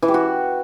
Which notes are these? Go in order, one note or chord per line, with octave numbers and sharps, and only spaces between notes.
E3
G4
F#4